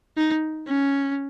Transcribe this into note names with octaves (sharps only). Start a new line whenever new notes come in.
D#4
C#4